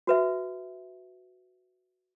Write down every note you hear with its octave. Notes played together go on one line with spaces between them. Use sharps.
F#4 B4 E5